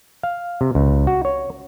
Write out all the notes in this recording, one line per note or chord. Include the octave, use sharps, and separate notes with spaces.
F5
C3
C#2
F#4
C#5